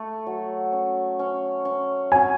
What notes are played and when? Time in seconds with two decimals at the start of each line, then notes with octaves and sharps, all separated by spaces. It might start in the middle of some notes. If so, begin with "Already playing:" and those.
Already playing: A3
0.26 F#3
0.73 C#4
1.19 C#4
1.65 C#4
2.12 F#3 G#5